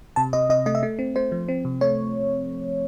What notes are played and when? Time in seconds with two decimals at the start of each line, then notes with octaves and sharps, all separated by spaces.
0.16 C3 A5
0.33 C3 D#5
0.50 C3 D#5
0.66 A3 D#5
0.75 E5
0.83 A3
0.99 C4
1.16 A3 C5
1.32 F3
1.48 C4
1.65 C3
1.81 A3 C#5